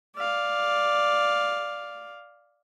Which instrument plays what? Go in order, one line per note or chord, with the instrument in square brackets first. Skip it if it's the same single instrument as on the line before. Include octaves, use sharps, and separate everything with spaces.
[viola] D5 F5